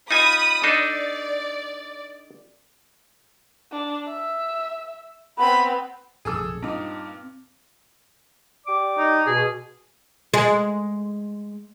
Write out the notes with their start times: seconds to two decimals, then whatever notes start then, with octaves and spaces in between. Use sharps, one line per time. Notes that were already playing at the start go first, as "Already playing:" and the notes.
0.11 D#4 F4 G#5 B5 D#6
0.64 D4 D#4 A4 D5
3.72 D4
4.08 E5
5.38 B3 C4 B5
6.25 A#1 F#2 C3 G#4 A4 E6
6.63 G2 A#2 C4 D#4
8.67 G4 D5 D6
8.97 D#4
9.27 B2 G#4
10.34 G#3